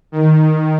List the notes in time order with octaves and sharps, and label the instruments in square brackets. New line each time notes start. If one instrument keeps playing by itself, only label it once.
[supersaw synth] D#3